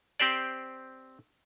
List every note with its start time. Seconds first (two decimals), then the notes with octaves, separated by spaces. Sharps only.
0.20 C4 G4 C5 D5